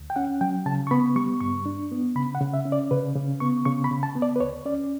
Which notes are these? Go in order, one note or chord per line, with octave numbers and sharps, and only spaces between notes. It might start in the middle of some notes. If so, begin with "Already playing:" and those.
Already playing: D2
G5
C#4 F#5
F#3 G5
C#3 A5
C#6
B3 B5
G3 C#6
G2 C#6
D4
B3
C#3 B5
F#5
C#3
E5
C#4
D5
C#3 B4
C#3
B3 C#6
C#3 C#6
B5
C#3
A5
B3
D5
B4
D2 C#5
C#4 D5